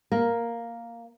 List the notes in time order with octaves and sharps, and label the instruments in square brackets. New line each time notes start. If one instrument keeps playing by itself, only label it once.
[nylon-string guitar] A#3